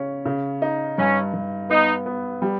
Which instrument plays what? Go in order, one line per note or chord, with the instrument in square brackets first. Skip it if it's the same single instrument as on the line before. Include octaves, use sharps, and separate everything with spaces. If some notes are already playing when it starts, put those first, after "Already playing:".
Already playing: [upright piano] C#3 C#4
C#3
D#4
[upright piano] G2 [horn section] C#4
[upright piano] G2
[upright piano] B3 [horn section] D#4
[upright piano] B3
G3